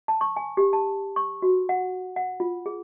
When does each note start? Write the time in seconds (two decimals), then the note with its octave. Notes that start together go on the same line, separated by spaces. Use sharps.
0.08 A5
0.21 C#6
0.36 G#5
0.57 G4
0.73 A5
1.16 C#6
1.42 F#4
1.69 F#5
2.16 F#5
2.40 F4
2.66 G#4